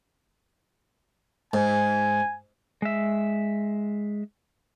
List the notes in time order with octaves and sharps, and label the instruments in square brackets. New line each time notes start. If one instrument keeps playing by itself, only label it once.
[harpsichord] G#2 [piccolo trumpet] G#5
[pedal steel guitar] G#3 E5